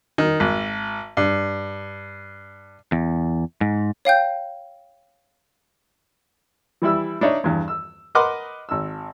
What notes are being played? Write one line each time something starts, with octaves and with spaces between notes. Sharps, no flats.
D#3
G#1
G2
E2
G#2
C#5 F5 G5 G6
E3 G3 E4 E6
D4 D#4 C#5 E5
E2 G2
E6
A#4 B4 D#5 F#5 C6 D6
G#1 E6